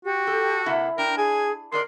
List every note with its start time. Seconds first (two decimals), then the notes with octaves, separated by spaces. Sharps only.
0.05 F#4 G4
0.27 A4
0.66 C3 A#3 E4 F#5
0.98 D4 A#4 G5
1.17 G#4 G#5
1.72 G#2 G#3 A#4 D5 C6